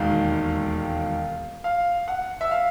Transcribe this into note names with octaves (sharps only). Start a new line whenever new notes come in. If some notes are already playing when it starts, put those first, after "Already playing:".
Already playing: E1 D#2 D#3 G#3 F5
F5
F#5
E5
F5